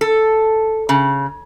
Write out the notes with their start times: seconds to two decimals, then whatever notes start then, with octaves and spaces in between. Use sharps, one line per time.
0.01 A4
0.89 C#3